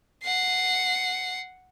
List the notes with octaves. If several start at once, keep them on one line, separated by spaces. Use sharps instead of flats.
F#5 C7